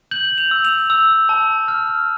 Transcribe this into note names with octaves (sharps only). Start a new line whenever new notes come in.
G6 F#7
F7
E6
F7
E6
A5
F6